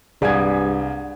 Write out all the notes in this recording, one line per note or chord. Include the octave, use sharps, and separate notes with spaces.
C2 G2 G#4 D5 F5 F#5 G#6